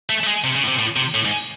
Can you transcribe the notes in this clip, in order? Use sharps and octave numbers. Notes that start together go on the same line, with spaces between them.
A3
A3
G#3
C3
C#3
A2
C3
A2
C3
A2
G#2